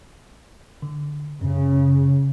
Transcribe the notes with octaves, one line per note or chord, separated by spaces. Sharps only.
D3
F#2 C#3